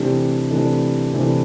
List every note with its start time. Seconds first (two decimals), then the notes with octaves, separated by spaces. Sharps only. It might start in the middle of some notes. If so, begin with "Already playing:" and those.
Already playing: C3 E3 A3 D4 G4
0.50 C3 E3 A3 D4 G4
1.13 C3 E3 A3 D4 G4